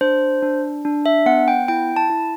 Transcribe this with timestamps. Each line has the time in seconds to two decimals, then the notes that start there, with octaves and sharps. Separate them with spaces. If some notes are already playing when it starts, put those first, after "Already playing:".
0.01 D4 C5
0.42 D4
0.85 D4
1.06 E5
1.26 B3 F#5
1.48 G5
1.68 E4 G5
1.96 A5
2.10 E4